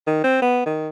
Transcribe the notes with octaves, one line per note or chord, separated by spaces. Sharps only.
D#3
C4
B3
D#3